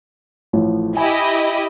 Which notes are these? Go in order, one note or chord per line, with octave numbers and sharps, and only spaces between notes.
A1 A2 F3
E4 G4 D#5 G#5